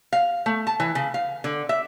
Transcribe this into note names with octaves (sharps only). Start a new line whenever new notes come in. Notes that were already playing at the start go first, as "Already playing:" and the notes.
F5
A3
A5
E3
C#3
F5
D3
E5